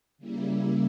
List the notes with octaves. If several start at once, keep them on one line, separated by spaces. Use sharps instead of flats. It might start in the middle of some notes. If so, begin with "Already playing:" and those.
C#3 G3 A#3 E4